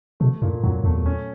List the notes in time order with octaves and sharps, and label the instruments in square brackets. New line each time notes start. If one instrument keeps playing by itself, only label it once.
[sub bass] B2 [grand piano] A3
[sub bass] F#2 [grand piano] A#2
[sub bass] F2 [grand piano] F#3
[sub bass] E2 [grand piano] A3
[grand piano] C#4